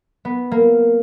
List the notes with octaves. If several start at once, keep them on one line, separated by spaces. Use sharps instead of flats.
B3
A#3